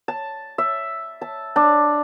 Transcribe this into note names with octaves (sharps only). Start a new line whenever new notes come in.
A5
E5
A5
D4